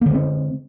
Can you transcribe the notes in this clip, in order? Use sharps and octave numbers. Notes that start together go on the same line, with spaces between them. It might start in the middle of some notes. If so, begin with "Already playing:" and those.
D3 G#3 A#3 C4